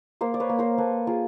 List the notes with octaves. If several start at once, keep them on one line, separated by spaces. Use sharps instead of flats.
A#3 A#4 C5
D5
B4 C#5
A#3
A#4 C5
A#3 A4 B4
F4 G#4 A#4